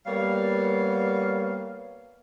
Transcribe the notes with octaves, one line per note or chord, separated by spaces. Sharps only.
G3 A#3 B3 C#5 F5